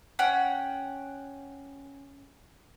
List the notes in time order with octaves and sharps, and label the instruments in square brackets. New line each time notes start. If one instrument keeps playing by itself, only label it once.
[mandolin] C#4 F#5 G5